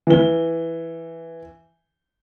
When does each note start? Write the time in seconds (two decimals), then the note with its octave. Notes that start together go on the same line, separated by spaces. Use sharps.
0.07 E3 G7